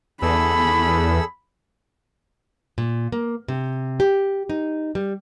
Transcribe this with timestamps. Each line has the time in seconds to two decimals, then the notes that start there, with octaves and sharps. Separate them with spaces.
0.22 E2 G#4 A4 B5 E6
2.78 A#2
3.12 A#3
3.48 C3
4.00 G4
4.49 D#4
4.95 G3